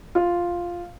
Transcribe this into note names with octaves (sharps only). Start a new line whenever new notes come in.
F4